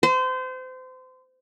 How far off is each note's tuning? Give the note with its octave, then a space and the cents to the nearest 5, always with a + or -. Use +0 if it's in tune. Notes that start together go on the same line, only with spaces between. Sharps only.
C5 -30